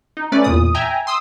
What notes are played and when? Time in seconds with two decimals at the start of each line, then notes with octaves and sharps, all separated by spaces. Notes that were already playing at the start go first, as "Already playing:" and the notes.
0.17 D#4
0.32 A3 C#4 B4 D5
0.44 E2 A#2 D#6
0.75 E5 G5 G#5 A#5
1.07 C6 D#6 E6